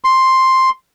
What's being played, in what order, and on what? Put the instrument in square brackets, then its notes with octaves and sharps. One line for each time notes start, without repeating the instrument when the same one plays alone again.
[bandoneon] C6